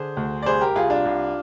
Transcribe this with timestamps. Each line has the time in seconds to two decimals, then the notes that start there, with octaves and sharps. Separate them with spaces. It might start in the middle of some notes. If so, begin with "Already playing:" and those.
Already playing: D3 G#4 C5
0.17 D2
0.42 D5
0.46 C2 G#4 C5
0.61 G4 A#4
0.76 C2 F4 G#4
0.90 D4 F4
1.05 C2